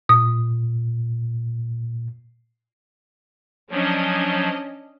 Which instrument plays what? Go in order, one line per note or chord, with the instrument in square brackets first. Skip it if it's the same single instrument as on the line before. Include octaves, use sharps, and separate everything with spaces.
[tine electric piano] A#2 [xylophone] D#6
[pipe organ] F3 F#3 [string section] C#4 D4 D#5